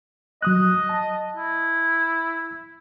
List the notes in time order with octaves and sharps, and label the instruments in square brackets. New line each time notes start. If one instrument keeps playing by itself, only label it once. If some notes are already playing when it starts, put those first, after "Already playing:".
[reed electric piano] F#3 D#6 F#6 [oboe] D#5
[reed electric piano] A5
[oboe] E4